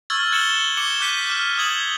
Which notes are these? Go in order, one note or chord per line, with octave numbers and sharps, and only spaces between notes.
C#6 E6 F6 G#6 A6
F#6 A6 C#7 E7 F#7 G7
D6 C#7 E7 G7
D6 F#6 G6 B6 D#7
F6
D#6 G#6 F#7 G7